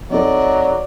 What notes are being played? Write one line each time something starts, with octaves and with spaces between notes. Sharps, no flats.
F#3 C4 D#4 A4 D5 D#5